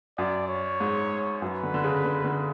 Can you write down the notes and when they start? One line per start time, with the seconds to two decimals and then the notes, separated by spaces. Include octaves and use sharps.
0.18 F#2 D5
0.48 C#5
0.80 G#2
1.42 F#2 B4
1.63 D3
1.74 D3
1.84 C#3
2.05 D3
2.24 D3